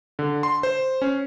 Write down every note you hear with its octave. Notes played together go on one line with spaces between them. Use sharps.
D3
C6
C5
C#4